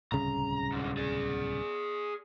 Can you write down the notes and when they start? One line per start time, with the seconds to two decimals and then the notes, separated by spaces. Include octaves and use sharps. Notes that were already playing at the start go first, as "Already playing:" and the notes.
0.12 D1 C2 C#3 A#5
0.72 G#2 D3
0.97 G#4 D5